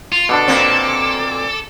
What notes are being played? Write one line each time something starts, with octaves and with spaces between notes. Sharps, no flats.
F4 F7
B2 D3 D4 A4 D6
A#2 A#3 C4